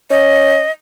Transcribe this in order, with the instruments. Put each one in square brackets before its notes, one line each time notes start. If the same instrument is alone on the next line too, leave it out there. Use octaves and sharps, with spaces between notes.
[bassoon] C#4 [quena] D#5